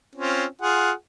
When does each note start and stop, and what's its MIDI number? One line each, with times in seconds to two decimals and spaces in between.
0.15 0.45 60
0.15 0.45 61
0.15 0.45 65
0.62 0.92 65
0.62 0.92 68
0.62 0.92 78